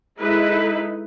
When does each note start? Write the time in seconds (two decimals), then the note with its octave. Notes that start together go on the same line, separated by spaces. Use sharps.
0.19 G#3 D#4 E4 A4 B4